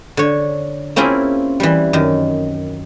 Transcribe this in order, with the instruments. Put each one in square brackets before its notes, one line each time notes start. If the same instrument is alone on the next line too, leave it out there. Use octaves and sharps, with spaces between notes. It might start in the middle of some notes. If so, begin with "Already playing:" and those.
[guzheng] D3 C#5
A#3 C4 C#4 E4 F4 G#4
E3 G3
F#2 D#3